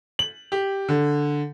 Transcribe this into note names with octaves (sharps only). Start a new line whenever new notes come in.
F#7
G4
D3